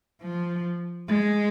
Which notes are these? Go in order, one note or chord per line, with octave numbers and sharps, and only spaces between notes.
F3
G#3